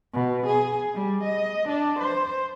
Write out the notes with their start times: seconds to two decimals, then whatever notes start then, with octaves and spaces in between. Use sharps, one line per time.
0.13 B2
0.46 G#4
0.94 G3
1.24 D#5
1.69 D4
1.99 C5